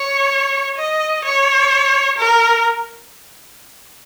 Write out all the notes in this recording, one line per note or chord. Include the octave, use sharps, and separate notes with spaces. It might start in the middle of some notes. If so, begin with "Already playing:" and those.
Already playing: C#5
D#5
C#5
A#4